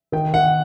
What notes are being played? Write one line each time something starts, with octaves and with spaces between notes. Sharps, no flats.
D#3 G5
D#3 F#5